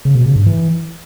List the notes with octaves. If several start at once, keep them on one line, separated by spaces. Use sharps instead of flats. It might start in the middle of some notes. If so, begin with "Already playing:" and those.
C#3
B2
C#3
G2
E3